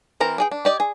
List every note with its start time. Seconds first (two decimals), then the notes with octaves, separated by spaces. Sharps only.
0.20 E3 C4 A#4 A#5
0.38 D4 G#4 G5
0.51 D4
0.65 G4 D5 D#5
0.80 G#4